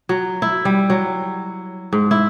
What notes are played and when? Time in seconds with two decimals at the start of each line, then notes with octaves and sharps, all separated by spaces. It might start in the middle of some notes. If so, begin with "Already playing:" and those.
0.09 F#3
0.42 E4
0.65 G3
0.90 F#3
1.93 G#2
2.11 E4